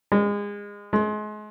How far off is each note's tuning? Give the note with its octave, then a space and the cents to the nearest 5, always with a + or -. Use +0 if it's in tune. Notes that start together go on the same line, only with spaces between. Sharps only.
G#3 -25
G#3 +35